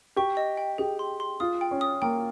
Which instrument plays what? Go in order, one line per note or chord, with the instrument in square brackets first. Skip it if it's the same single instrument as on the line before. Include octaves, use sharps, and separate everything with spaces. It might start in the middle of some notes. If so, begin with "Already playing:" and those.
[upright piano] G4 [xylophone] C#6
[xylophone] D#5
G5
[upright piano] G4 [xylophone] G#4
[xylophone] C6
C6
[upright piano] F4 [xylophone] D#6
[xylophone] G5
[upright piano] C#4
[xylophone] D#6
[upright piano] A#3 [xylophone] G5